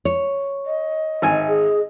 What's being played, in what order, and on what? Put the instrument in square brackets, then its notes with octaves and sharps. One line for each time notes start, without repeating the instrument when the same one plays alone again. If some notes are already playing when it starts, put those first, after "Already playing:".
[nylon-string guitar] C#5
[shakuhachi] D#5
[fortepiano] G#1 G#5
[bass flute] G#4